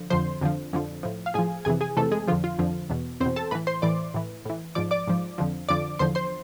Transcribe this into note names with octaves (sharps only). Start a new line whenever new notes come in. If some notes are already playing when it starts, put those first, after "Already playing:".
Already playing: D3 F3
F2 D3 F3 C5 C6
F2 D3 F3
F2 D3 F3
A2 F3
F5
A2 F3 G#4 G#5
F2 C3 E3 G#4 G#5
G#4 G#5
F2 C3 E3 A3 A4
G#3 G#4
F2 D3 F3 F4
F4
F2 D3 F3
E2 B2
E2 C4 C5
B2
A4 A5
A2 E3 B4 B5
C5 C6
A2 E3 D5 D6
A2 E3
A2 E3
G#2 F3 D5 D6
D5 D6
G#2 F3
F2 D3 F3
F2 D3 F3 D5 D6
E2 D3 F3 C5 C6
C5 C6